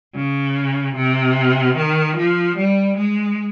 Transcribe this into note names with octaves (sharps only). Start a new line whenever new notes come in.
C#3
C3
D#3
F3
G3
G#3